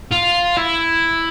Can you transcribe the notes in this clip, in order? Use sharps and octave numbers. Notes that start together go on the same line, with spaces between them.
F4
E4